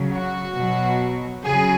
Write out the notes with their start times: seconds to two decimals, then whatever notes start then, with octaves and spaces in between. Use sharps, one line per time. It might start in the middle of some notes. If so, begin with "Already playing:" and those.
Already playing: C#3 F#3
0.13 F#4
0.56 B2 F#3
1.44 C#3 F#3 G#4